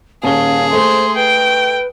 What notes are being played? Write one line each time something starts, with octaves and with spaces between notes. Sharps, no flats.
D#1 C#4 G#4 F5 G7
A3 C5 C6
B4 G5